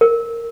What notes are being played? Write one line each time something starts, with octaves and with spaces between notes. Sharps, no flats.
A#4